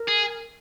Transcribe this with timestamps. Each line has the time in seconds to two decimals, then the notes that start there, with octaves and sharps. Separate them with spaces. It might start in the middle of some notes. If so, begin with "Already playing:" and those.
Already playing: A#4
0.08 G#4